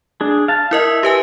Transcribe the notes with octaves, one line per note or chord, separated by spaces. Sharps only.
D4 G#4
F5 A5
E4 A#4 D#5 E5
G4 B4 G#5